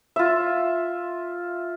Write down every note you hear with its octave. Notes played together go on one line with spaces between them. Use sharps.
F4 E5